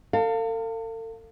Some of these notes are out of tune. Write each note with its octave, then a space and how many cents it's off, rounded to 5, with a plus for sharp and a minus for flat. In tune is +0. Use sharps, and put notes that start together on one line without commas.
A4 +40 F5 +0